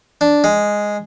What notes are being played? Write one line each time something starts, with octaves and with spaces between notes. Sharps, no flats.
D4
G#3